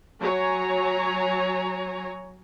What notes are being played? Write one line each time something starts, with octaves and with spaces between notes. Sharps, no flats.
F#3 C#5 G#5 A#5